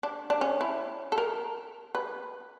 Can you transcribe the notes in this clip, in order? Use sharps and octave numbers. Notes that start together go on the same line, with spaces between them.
D4
D4
C#4
E4
A4
A#4
B4